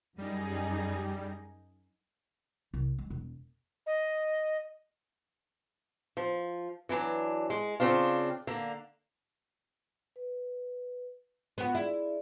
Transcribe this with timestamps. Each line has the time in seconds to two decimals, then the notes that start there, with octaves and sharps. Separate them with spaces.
0.18 F#2 G3 D#4 G#4
2.74 C2
2.98 G#3
3.10 E1
3.86 D#5
6.17 F3
6.89 E3 F#3 D4
7.50 G#3
7.80 C#3 C4 D4 F4
8.47 D3 A#3
10.16 B4
11.58 B3 F4 F#4 B5
11.75 E4 G#4 D5